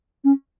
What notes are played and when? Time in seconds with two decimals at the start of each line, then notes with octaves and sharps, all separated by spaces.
0.24 C#4